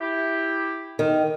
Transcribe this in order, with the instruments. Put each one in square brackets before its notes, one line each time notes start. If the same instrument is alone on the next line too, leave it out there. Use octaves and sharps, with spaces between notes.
[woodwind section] E4 G4
[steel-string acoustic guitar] D#3